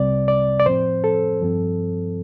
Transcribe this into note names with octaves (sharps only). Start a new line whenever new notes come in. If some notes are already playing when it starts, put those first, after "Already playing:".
Already playing: C2 C3 G3 C4 D5
D5
D5
A2 F3 C4 C5
A4
G2 F3 C4